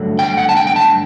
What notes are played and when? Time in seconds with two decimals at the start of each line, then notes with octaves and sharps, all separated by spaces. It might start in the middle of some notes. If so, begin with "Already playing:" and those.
Already playing: G2 D3 F#3 A3
0.19 G5
0.37 F#5
0.49 A5
0.57 G5
0.67 G5
0.76 A5